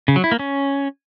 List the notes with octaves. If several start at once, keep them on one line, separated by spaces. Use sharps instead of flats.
C#3
F#3
E4
A#3
C#4